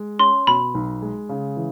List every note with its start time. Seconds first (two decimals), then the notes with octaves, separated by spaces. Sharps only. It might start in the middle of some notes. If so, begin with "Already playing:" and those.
Already playing: G#3
0.19 C#4 C6
0.47 B2 B5
0.74 B1
1.02 G#3
1.29 C#3
1.57 E3